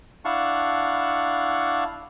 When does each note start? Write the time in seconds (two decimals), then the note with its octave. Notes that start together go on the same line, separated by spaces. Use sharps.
0.25 D4 E4 F5 F#5 A5 C#6